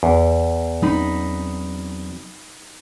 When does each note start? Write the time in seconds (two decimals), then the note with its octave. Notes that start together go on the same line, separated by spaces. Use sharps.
0.03 E2
0.82 F#3 C4 C#4 D#4 B5